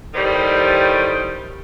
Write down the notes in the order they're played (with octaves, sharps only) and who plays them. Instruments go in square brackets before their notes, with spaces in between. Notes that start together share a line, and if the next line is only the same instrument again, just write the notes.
[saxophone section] A2 D#3 G3 C5